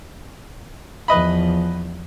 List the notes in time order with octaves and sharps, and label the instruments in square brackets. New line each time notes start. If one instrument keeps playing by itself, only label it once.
[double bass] E2 F3 [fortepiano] B4 D#5 B5